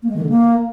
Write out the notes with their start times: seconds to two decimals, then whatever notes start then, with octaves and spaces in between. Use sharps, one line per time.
0.03 A#3
0.09 G#3
0.16 D#3
0.23 D3
0.29 A#3